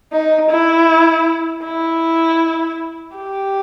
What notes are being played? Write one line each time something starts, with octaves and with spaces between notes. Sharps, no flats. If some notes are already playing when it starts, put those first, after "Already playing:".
D#4
E4
E4
G4